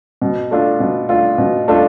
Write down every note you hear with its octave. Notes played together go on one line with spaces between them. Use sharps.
B2
A3 D4 F4 A4
B2
A3 D4 F4 A4
B2
A3 D4 F4 A4